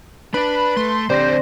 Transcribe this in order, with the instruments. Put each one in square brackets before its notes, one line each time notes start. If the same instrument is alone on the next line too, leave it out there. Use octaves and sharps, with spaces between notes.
[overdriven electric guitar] D4 D5 [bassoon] B4 [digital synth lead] B5
[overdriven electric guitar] A3 [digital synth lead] C6
[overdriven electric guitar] D3 C4 [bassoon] G3 [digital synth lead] C5 [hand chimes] D5 C6 A#6